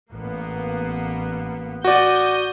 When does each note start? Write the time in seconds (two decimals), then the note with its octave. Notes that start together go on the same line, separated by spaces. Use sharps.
0.12 A1 A#3 B3
1.84 F#4 D5 D#6 G6